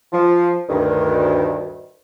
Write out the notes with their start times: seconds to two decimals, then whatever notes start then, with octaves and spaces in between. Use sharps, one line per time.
0.12 F3
0.69 D2 G2 D#3